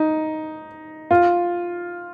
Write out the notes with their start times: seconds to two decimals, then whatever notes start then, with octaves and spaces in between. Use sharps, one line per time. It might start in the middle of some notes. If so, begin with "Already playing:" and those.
Already playing: D#4
1.11 F4